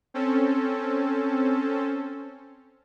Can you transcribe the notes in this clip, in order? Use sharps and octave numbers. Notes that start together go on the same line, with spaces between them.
C4 C#4 A4